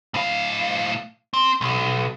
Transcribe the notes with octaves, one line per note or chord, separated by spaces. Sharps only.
A2 F5
C4
B1